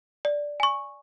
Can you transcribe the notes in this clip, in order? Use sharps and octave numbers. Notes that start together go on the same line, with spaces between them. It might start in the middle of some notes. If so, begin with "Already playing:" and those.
D5
G#5 C#6